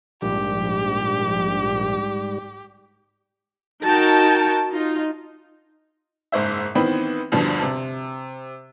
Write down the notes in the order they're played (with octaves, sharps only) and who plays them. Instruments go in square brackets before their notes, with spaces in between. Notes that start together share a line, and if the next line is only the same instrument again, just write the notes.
[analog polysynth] A#1 [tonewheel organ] G#2 G3 [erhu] G4
[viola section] D#4 F#4 A#4 G5 A5
D#4 F4
[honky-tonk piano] F#1 G#2 C5 E5
D#3 E3 B3 C4 B5
E2 G2 B2 D3 F3
C3